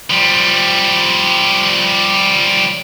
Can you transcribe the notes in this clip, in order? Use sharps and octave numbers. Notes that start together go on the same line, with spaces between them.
F3 G3